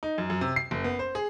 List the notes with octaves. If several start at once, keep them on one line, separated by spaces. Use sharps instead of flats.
D#4
F#2
F#2
C3
C7
F#1
B3
C5
G#4